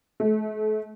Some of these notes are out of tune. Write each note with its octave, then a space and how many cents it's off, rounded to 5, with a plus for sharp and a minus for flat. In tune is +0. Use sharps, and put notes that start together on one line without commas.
A3 -35